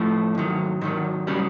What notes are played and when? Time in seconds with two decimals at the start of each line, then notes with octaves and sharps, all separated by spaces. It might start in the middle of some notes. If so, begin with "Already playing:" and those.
Already playing: A2 F3 A3
0.35 G#2 D#3 F#3
0.81 G#2 D#3 F#3 G#3
1.27 C#3 F#3 G3